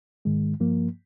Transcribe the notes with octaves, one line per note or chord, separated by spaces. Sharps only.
G#2 D#3 G#3
G2 F3 A#3